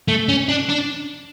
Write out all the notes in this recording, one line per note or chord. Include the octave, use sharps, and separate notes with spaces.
A3
C#4
D4
D4